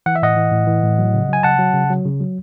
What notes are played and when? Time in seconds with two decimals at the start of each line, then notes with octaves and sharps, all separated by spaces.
0.06 E3 F#5
0.16 E5
0.22 A2 D#5 F#5
0.37 E3
0.52 A2
0.67 E3
0.83 A2
0.99 F#3
1.14 C#3
1.29 F#3 G#5
1.43 C#3 F#5 A5
1.59 F#3
1.74 C#3
1.90 F#3
2.06 C#3
2.20 F#3